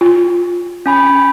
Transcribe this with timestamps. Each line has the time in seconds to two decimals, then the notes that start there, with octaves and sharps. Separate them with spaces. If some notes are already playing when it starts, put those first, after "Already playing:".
0.01 F4
0.86 C#4 G#5 B5